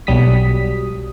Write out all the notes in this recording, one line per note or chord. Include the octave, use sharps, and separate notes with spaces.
B1 F#3 G3 D#6 B6